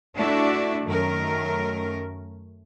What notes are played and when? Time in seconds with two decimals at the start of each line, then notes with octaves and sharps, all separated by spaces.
0.16 A3 D4 E4 F#4 D5 E5
0.84 F#2 D#3 A3 C#4 A#4